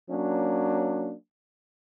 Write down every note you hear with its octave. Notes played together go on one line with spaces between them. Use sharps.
F#3 A#3 C#4 D4